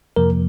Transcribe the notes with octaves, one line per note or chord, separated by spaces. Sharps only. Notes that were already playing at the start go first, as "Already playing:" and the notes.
F2 C3 F3 A#3 A#4